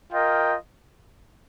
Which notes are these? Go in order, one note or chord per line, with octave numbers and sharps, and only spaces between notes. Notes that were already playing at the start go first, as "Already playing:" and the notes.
F4 A#4 D#5 G5